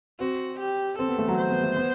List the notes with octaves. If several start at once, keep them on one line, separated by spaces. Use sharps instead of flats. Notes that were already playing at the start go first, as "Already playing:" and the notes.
C4 F#4
G4
C4 A4
B3
A3
F#3
C5
B3
A3
B3